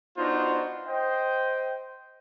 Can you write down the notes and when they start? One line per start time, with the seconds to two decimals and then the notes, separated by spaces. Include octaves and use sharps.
0.18 B3 D4 D#4 F4 F#4 C5
0.87 C5 D#5 G5